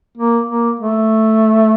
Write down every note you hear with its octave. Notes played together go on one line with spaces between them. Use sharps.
A#3
A#3
A3